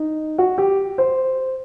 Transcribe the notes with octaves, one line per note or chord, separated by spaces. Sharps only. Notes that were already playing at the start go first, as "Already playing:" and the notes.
Already playing: D#4
F#4
G4
C5